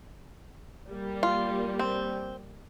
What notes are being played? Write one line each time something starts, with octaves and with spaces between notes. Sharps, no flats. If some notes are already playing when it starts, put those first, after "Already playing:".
G3 A#3
F4
C4